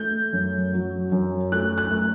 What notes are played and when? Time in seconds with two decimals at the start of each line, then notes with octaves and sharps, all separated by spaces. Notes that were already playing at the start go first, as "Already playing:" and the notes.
Already playing: A3 G6
0.33 F#2
0.73 F#3
1.12 F#2
1.52 A3 F#6
1.78 F#6
1.91 A3